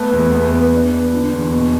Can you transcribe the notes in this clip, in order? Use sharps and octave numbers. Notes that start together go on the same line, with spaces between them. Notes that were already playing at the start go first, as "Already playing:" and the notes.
Already playing: A3 B3
E2
B3
B3
D4
B3
D3
E2
B2